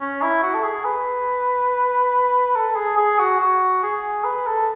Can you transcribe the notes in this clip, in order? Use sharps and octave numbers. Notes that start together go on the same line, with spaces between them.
C#4
E4
F#4
A4
G#4
B4
A4
G#4
G#4
F#4
F#4
G#4
B4
A4